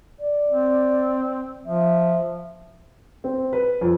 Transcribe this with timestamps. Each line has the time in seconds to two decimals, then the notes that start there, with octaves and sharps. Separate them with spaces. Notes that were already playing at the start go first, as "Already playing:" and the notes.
0.20 D5
0.49 C4
1.66 F3 E5
3.24 C4
3.53 B4
3.81 F2